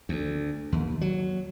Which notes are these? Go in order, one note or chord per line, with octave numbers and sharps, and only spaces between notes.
D2
D#2
F#3